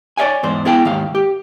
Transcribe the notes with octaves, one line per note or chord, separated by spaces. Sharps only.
C#5 D5 E5 F#5 G#5
E2 G#2 C5
B3 E4 G#4 F5 G5
D#2 G#2 F5
G4